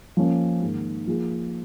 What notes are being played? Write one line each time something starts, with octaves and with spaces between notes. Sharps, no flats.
F3 A#3 C#4
G#2 D#3 A#3
F3 A#3 F4 G#4